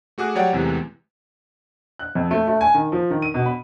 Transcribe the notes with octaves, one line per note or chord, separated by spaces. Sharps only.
A3 F#4 G#4 D6 F#6
F#3 G3 C#5 D5 F#5 G5
E2 C3 E3 G#3 A3
F#6
F2
A3
A3
G#5
D#3
F3
D#3
D#7
B2
B5